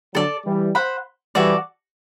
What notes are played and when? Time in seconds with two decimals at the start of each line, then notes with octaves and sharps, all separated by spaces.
0.14 D3 F#3 A4 D5 A5
0.45 E3 G3
0.75 C5 F#5 B5
1.35 E3 G3 F#4 A4 D5